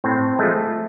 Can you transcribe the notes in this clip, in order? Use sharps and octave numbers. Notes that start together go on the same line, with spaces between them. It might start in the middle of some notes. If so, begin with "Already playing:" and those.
A2 C4
F3 G#3 A3